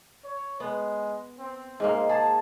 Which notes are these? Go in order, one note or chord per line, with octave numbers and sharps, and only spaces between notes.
C#5
G#3 B3
C4
G#2 G#3 A#3
G#4 A5